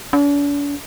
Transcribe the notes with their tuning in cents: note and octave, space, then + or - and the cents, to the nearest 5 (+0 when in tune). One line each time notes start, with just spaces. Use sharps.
D4 -45